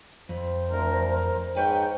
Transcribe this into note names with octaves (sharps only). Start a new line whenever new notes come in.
F2 C5
D2 A#4
A#4
G#2 B4 C#5 G5